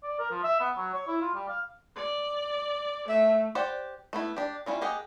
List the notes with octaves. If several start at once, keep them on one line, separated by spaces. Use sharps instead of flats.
D5
A#4
F3
E5
B3
F#3
C#5
E4
F4
G3
F5
D5
A3 E5
G4 C5 D5 F#5
A3 B3 E4
D4 G4
G3 C#4 E4 F4
A#3 G4 G#4 D#5 F#5